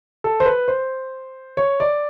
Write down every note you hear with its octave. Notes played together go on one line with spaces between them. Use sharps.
A4
C5
B4
C5
C#5
D5